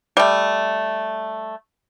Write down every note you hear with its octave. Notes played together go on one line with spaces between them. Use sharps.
G3 A3